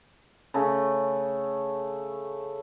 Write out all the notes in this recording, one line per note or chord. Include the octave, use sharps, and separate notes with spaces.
C#3 A3